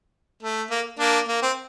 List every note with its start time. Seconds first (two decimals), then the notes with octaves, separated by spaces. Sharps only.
0.43 A3
0.71 A#3
0.99 A#3 D4
1.28 A#3
1.42 C4